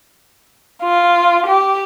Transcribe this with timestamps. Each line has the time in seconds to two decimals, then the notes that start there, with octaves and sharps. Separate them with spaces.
0.83 F4
1.46 G4